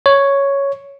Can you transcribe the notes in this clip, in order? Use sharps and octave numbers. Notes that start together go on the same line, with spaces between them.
C#5